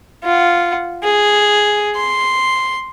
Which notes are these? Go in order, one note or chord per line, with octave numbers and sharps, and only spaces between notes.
F4 F#5
G#4
C6